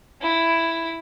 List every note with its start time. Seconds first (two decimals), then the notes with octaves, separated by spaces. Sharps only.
0.22 E4